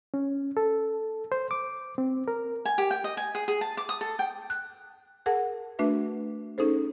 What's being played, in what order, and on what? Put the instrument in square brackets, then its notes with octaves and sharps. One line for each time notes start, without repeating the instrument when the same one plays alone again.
[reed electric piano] C#4
A4
C5
D6
C4
A#4
[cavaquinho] G#5
G4
G5
D#5
G#5
G#4
G#4
A5
D6
D#6
A4
G5
[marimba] F#6
G#4 A#4 F#5 A5
A3 D4 F#4 B4 E5
C#4 D#4 G#4 A4 C5